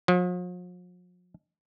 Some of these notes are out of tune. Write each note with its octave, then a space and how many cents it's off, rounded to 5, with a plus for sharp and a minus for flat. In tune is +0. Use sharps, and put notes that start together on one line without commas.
F3 +45